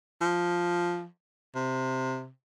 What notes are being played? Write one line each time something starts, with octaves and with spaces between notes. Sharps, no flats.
F3
C3